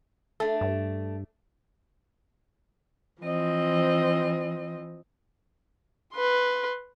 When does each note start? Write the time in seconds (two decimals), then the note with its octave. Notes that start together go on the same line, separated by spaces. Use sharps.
0.40 A3 D4 A4
0.61 G2
3.21 E3 F3 C4 D#5
6.14 B4 C6